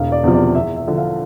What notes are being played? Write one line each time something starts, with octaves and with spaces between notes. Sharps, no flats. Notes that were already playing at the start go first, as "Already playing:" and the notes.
Already playing: E1 F5
D5
E2 C3 F3
D5
E2 E5
E5
D3 F3
F5